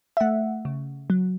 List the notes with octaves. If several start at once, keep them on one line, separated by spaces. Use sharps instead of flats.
E5
A3 F#5
C#3
F#3